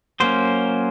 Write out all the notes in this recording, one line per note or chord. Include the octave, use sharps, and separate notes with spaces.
F#3 A#3 C#4 C5